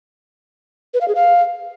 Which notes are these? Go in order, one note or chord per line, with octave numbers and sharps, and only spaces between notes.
B4
F5
G#4
F5